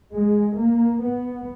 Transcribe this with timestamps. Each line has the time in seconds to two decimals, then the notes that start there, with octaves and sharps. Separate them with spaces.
0.13 G#3
0.58 A#3
1.01 B3